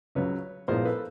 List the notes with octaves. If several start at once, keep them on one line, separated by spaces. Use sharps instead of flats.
C#2 C#3 F#3 B4 C#5
A#1 A2 F3 G#3 B3 A#4 C5
A4 B4